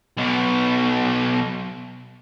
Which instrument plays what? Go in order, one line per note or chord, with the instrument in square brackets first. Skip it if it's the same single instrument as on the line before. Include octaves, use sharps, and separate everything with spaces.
[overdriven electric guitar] B1 B2